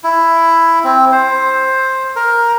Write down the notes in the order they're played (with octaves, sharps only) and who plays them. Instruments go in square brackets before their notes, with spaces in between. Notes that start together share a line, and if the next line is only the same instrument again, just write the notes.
[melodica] E4
C4
C5
A#4